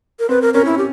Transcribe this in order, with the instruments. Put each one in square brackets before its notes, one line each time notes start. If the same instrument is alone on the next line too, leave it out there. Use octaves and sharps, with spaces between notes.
[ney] A#4
[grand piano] C4 [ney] B4
[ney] A#4
[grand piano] C#4 [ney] A#4
[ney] E4
G4